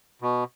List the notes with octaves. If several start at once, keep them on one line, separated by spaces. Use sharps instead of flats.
B2